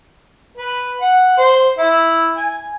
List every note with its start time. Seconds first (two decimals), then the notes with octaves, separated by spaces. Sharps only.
0.57 B4
1.01 F#5
1.37 C5
1.78 E4
2.36 G#5